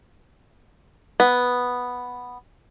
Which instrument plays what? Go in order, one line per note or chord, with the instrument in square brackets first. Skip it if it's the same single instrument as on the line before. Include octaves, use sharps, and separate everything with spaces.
[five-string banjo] B3